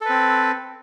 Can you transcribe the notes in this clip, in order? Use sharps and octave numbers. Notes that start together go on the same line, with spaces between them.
C4 A4 B4